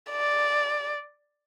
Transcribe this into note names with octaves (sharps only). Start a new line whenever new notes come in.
D5